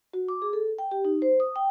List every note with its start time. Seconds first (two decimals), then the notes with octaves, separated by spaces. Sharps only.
0.13 F#4
0.29 D6
0.42 G#4
0.53 A4
0.79 G5
0.91 G4
1.05 D#4
1.22 C5
1.40 D#6
1.56 G5